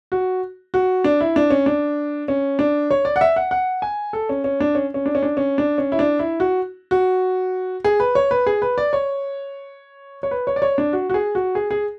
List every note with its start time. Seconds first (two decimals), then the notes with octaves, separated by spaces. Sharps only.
0.12 F#4
0.74 F#4
1.04 D4
1.21 E4
1.36 D4
1.50 C#4
1.66 D4
2.28 C#4
2.59 D4
2.91 C#5
3.05 D5
3.16 F#5
3.21 E5
3.36 F#5
3.51 F#5
3.82 G#5
4.13 A4
4.29 C#4
4.44 C#4
4.60 D4
4.75 C#4
4.94 C#4
5.06 D4
5.15 C#4
5.23 D4
5.37 C#4
5.58 D4
5.78 C#4
5.92 E4
5.99 D4
6.19 E4
6.40 F#4
6.91 F#4
7.84 G#4
8.00 B4
8.15 C#5
8.31 B4
8.47 G#4
8.62 B4
8.78 D5
8.93 C#5
10.23 C#5
10.31 B4
10.47 C#5
10.56 D5
10.62 C#5
10.78 D4
10.93 F#4
11.10 F#4
11.14 G#4
11.35 F#4
11.55 G#4
11.71 G#4